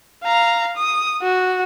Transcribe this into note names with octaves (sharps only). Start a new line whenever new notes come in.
F5 A#5
D#6
F#4